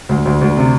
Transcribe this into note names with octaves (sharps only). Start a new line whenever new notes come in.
D2
D2
D2
C3